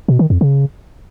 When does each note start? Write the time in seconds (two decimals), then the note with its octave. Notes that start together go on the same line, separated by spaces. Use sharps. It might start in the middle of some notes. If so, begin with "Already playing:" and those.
0.08 B2
0.19 D#3
0.30 F2
0.41 C#3